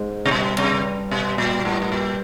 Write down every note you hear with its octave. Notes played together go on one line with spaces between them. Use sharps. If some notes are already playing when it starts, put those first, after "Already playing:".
Already playing: G#2 G#3
C3
G2 B2 G3
C3
B2
A#2
A2
A2
A#2